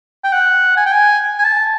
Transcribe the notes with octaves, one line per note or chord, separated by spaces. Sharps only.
G5
F#5
G#5
G5
G#5
G#5
A5